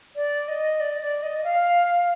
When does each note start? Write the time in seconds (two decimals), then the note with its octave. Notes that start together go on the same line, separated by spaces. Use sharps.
0.16 D5
0.48 D#5
0.80 D5
1.02 D5
1.23 D#5
1.39 D#5
1.44 F5